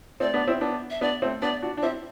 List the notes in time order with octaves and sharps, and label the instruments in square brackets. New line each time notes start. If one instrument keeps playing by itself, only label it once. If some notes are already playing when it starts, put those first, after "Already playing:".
[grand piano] A3 C4 [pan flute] D5
[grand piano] B3 D4
C4 E4
B3 D4
[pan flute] E5
[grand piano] B3 D4 [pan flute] D5
[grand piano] A3 C4
[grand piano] B3 D4 [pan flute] D5
[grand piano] D4 F#4
D4
[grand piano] C4 E4 [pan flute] E5